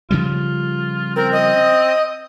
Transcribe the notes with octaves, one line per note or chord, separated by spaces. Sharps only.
C#3 F3 G3 F4
C4 A#4
D#5